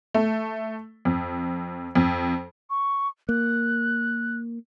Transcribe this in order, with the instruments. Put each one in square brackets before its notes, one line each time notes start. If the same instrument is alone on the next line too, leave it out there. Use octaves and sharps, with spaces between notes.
[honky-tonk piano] A3
F2
F2
[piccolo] C#6
[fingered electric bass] A#3 [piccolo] F#6